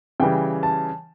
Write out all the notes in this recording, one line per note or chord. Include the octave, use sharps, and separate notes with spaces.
C#3 E3 G3 G5
A5